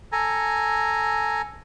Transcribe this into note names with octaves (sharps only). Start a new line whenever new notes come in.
A4 G#5 A#5